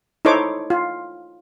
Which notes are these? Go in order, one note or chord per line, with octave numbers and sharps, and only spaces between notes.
D#4 E4 A4 C5 C#5 D6
F4